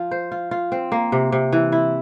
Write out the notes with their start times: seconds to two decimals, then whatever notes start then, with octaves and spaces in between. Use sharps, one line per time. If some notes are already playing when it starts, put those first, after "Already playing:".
Already playing: F3 F4
0.11 C5
0.31 F4
0.51 F4
0.72 C4
0.92 A#3
1.12 C3
1.32 C3
1.52 E3
1.72 E4